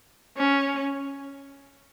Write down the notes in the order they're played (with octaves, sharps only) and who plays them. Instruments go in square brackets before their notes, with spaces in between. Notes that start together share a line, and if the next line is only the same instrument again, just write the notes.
[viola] C#4